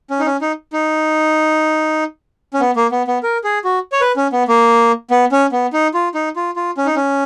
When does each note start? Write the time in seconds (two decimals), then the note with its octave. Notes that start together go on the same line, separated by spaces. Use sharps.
0.10 C#4
0.19 D#4
0.26 C#4
0.41 D#4
0.73 D#4
2.54 C#4
2.60 B3
2.76 A#3
2.92 B3
3.07 B3
3.23 A#4
3.44 G#4
3.64 F#4
3.92 C#5
4.01 B4
4.17 C#4
4.32 B3
4.48 A#3
5.11 B3
5.32 C#4
5.52 B3
5.73 D#4
5.94 F4
6.14 D#4
6.36 F4
6.56 F4
6.77 C#4
6.86 D#4
6.96 C#4